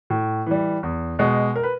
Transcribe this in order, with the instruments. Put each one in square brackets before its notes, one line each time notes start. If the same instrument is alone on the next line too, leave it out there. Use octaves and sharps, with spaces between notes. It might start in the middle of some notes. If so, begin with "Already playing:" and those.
[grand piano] A2
E3 G3
E2
B2 G#3
A#4
B4